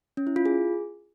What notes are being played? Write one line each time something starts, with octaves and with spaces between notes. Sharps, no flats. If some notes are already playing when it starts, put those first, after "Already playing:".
C#4
E4
F4
G#4